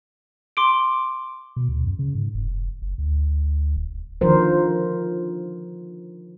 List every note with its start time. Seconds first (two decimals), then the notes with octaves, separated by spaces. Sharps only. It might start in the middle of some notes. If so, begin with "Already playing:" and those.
0.57 C6 D6 D7
1.56 B2
1.69 D2
1.84 F#2
1.99 C#3
2.15 G#2
2.34 F1
2.82 F#1
2.98 D2
3.76 D#1
4.21 D3 D#3 F3 A#4 C5